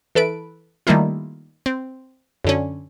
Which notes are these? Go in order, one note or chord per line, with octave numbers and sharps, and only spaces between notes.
E3 A4 B4 D7
D#3 G3 A3 A#3 E4 F4
C4
F#2 D3 C#4